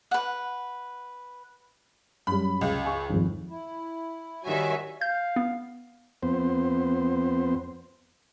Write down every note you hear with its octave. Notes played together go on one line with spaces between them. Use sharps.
B4 F#5
F#2 G3 B5
C#2
G#5 C#6
G#1 F2
E4
D#3 G3 F#4 C#5 E5 G#5
F5 G6
B3
F2 B3 C4 C5